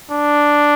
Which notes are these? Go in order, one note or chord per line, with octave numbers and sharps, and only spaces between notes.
D4